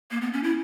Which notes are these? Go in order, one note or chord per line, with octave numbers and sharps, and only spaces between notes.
A#3
B3
C#4
E4